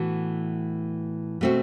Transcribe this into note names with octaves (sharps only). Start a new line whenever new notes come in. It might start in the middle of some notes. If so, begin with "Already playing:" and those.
Already playing: A2 E3 B3 F#4
B2 A3 C4 F#4